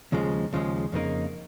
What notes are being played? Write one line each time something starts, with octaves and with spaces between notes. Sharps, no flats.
D#2 C#3 F3 G#3
D#2 C#3 F3 G#3
F2 C#3 A#3 D#4 A#4